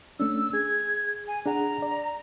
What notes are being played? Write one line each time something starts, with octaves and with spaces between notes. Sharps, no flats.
A3 C#4 D4 E6
G#4 G#6
G#5
D4 G#4 F#5 A#5
D5